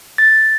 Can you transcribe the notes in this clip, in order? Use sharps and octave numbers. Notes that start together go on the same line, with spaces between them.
A6